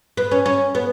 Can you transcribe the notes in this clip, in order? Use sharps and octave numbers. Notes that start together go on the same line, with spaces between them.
B3
C#4
C#4
B3